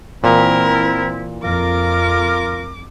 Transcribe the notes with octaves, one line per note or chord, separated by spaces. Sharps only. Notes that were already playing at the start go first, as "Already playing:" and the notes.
A#2 E3 C4 E4 A#4
F2 F4 A#4 D6